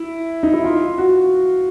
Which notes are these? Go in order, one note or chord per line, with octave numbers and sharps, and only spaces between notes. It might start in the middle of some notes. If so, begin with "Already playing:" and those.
Already playing: E4
D#4
E4
F4
F#4